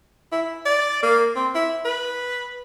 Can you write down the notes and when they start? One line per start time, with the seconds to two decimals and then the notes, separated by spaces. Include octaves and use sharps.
0.32 E4
0.65 D5
1.03 A#3
1.36 C4
1.55 E4
1.85 B4